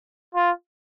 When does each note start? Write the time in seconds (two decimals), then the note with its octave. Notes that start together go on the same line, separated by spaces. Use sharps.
0.35 F4